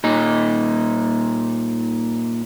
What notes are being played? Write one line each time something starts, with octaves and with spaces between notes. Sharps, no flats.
A#2 D#4